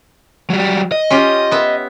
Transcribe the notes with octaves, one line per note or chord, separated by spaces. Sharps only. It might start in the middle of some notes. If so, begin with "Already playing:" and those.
F#3 G3
D#5
C#4 F4 G4
B3 E5